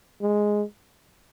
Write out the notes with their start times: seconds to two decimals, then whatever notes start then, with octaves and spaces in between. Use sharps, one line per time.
0.22 G#3